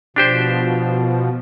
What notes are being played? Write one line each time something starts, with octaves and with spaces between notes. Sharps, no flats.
B2 F3 D4 G4 C5